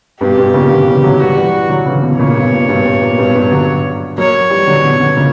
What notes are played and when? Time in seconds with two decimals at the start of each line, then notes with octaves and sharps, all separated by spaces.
0.21 G2 B2 G4
0.38 G2 B2
0.54 A#2 C#3
0.70 B2 D3
0.87 C#3 E3
1.04 D3 F#3
1.20 E3 G3 F#4
1.36 E3 G3
1.70 D3 F#3
1.86 C#3 E3
2.03 B2 D3
2.19 A#2 C#3 C#5
2.36 G2 B2
2.53 A#2
2.69 G2 B2
2.85 G2
3.02 A#2
3.18 G2 B2
3.35 G2
3.51 D3 F#3
4.18 F#3 A#3 C#5
4.50 E3 G3
4.67 D3 F#3
4.83 B2 D3
5.00 B2 D3
5.17 A#2 C#3